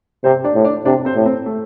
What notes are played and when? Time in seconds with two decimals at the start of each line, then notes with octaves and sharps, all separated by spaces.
0.24 C3 C4 C5
0.44 D4 D5
0.54 A2
0.65 D4 D5
0.85 C3 D4 D5
1.05 C4 C5
1.15 A2
1.26 C4
1.46 A3